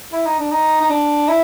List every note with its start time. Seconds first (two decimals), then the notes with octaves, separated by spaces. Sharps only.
0.12 E4
0.26 D#4
0.39 D4
0.51 D#4
0.81 D#4
0.90 D4
1.28 E4